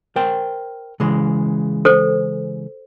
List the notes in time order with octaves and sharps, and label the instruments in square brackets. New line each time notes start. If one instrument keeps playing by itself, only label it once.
[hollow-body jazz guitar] A#4 C5 G5
C#3 E3 G#3
[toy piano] A4 C5